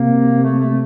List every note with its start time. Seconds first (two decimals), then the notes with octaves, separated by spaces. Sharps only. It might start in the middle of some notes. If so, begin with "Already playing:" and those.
Already playing: C3 A#3
0.42 A3
0.60 A3